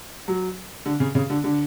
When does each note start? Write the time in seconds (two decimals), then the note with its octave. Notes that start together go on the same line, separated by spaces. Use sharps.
0.28 F#3
0.86 D3
1.00 C#3
1.15 C#3
1.30 D3
1.44 D3